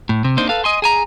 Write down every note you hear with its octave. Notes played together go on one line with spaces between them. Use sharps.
A2
C3
A#3 C4 D4 D#4 C5
A4 B4 F5
D#5 G#5 C6
G#4 G#5 A#5